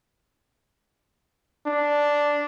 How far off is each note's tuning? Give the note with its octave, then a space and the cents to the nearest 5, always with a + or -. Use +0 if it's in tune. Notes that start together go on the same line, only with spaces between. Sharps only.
D4 -5